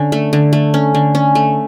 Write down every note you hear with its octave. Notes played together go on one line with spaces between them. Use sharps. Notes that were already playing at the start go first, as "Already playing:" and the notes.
Already playing: D3 C#4
A3
D3
A3
C#4
D3
C#4
A3